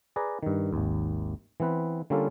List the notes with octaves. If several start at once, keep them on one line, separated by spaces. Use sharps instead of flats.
G#4 B4 D5 A#5
G2 D#3
G#1 D#2
E3 B3 C4 B4
D3 G3 A#3 C#4 F4 A4